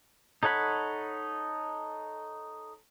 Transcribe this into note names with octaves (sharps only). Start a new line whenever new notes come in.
D#4 A4 C#5 F#5 B5